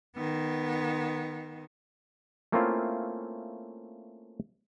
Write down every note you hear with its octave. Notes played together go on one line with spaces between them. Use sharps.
D#3 B3
A3 A#3 C4 C#4 E4 F4